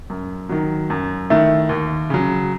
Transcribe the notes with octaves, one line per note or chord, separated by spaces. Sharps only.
F#2
D#3 F#3
F#2
D#3 A3 E4
D#2
C#3 F#3